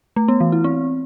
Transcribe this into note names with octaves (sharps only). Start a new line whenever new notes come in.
A3
B3
E3
E4
C4